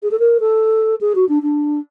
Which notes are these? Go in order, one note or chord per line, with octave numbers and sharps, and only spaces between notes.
G#4
A4
A#4
A4
G#4
F#4
D4
D4